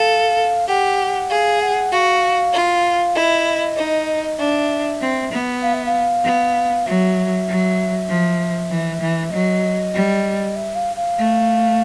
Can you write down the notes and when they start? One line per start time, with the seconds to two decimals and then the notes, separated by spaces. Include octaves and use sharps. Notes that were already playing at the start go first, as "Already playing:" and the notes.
Already playing: A4 F5
0.68 G4 F#5
1.30 G#4 F5
1.61 F#5
1.92 F#4 F5
2.54 F4
3.15 E4 D#5
3.77 D#4
4.38 D4 E5
5.00 C4
5.31 B3
5.62 F5
5.73 E5
5.85 F5
6.24 B3
6.85 F#3 E5
7.47 F#3
8.08 F3
8.70 E3
9.00 E3
9.31 F#3 D#5
9.93 G3
10.56 E5
10.75 F5
10.96 F5
11.17 A3